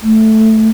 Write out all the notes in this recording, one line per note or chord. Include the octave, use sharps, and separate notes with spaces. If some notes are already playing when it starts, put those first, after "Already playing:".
A3